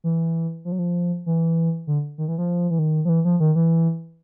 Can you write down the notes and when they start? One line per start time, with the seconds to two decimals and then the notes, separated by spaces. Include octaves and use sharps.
0.04 E3
0.65 F3
0.72 F#3
0.79 F3
1.26 E3
1.87 D3
2.18 D#3
2.28 E3
2.38 F3
2.70 E3
2.79 D#3
3.05 F3
3.09 E3
3.25 F3
3.40 D#3
3.56 E3